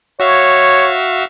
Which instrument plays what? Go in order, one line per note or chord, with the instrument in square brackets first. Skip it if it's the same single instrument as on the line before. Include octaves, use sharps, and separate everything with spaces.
[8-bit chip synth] F#4 E5 F5 [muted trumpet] C#5